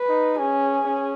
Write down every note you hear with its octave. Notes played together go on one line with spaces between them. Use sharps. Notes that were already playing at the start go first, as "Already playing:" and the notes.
Already playing: B4
D#4
C#4 G#4
C#4